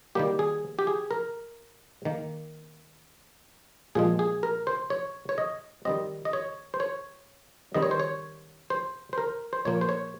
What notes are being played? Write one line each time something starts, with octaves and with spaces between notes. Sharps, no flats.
D#3 G3 A#3 G4
G#4
G4
G#4
A#4
D#3 A#3
A#2 F3 G#3 G#4
G#4
A#4
C5
C#5
C#5
D#5
D#3 G3 C4 D#5
D#5
C#5
C5
C#5
D#3 G3 C4 D#5
C#5
C5
C#5
C5
C5
A#4
C5
A#2 F3 A#3 C#5
C5
C#5